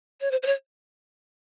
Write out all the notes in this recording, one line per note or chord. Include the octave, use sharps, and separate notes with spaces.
C#5
C5
C5
C#5